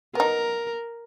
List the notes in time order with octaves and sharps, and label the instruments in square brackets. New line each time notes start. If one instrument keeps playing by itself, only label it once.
[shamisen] B3 D#4 [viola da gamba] A#4